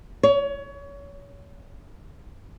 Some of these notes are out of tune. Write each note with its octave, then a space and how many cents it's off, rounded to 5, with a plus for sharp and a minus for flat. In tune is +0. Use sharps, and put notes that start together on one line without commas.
C#5 +25